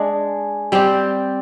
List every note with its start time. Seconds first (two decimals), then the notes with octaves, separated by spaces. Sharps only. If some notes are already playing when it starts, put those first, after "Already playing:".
Already playing: G#3 D4 G#4
0.72 G3 C4 G4